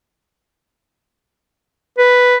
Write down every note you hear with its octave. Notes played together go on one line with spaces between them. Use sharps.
B4